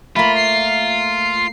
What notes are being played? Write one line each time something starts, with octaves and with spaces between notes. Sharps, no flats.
A3 A#3 F4 B5
C7